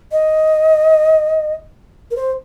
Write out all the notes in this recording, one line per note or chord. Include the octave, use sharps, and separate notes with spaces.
D#5
A#4
C5